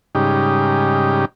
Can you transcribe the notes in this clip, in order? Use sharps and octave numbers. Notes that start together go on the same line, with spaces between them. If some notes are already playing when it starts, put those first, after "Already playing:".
G#2 C#3 G3 D#4 G4